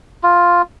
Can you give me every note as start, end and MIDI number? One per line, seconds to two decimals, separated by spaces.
0.23 0.62 65